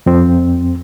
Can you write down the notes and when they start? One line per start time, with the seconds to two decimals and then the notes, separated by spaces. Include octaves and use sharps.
0.06 F2 C4